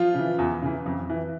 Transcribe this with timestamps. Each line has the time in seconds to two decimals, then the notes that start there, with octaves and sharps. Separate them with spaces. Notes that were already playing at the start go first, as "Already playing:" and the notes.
Already playing: F3 F4
0.14 C#3 E3
0.39 E2
0.62 C#3 E3
0.86 F2
1.09 E3